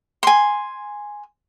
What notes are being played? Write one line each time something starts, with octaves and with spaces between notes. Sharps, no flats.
G#5 C6